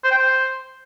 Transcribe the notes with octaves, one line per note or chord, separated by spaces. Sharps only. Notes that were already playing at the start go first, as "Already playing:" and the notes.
C5
G5
C5